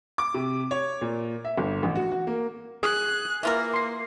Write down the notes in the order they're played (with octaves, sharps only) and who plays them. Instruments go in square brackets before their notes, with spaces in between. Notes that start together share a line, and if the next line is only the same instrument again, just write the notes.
[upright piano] D6
C3
C#5
A#2
E5
G1
A1
F#4
F#4
A#3
[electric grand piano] G#4 D#6 [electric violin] F#6
[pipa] E3 F4 A#4 [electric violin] A#3 [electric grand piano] E5
[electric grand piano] C6 C7